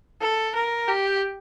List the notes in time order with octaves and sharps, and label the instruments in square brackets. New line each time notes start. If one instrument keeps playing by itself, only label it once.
[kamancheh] A4
A#4
G4